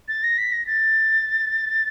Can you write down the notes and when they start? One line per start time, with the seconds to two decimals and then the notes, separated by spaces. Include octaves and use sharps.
0.08 A6
0.23 A#6
0.38 B6
0.52 A#6
0.67 A6